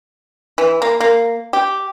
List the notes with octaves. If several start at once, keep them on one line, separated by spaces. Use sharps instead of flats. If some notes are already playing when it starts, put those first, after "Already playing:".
E3
A#3
A#3
G4